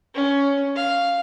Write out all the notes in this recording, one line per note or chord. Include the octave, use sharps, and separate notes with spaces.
C#4
F5